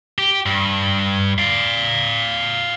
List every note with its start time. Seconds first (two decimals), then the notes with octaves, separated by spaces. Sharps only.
0.18 G4
0.46 G2
1.38 D5 F5